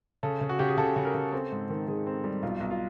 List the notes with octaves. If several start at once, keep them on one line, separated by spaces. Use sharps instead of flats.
C#3 A4
C#3
F#4
C#3 G4
G#4
C#3 A4
C#3
A#4
C#3
C4 A4
G#2
D#3
D#3 G#4
C4
G3
B1 F4
B1
F4